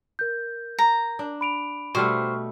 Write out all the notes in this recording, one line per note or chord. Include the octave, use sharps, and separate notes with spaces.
A#4 G6
A#5
D4
B5 D7 F7
B2 G3 A3 C5 C#6 F6